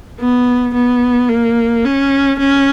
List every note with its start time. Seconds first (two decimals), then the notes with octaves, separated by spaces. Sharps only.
0.20 B3
0.74 B3
1.29 A#3
1.85 C#4
2.39 C#4